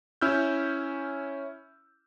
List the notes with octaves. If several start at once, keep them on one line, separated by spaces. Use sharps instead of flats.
C#4 E4 E6 F6 G6